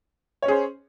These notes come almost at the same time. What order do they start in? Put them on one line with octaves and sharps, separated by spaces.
C#5 C#4 G#4 C5